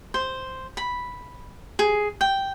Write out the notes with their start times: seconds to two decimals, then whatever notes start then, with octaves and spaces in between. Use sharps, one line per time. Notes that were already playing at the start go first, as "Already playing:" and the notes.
0.14 C5
0.77 B5
1.79 G#4
2.21 G5